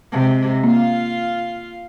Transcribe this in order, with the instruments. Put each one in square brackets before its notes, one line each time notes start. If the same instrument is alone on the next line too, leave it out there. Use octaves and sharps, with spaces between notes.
[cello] C3 G#3
[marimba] A#3 [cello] F4 F5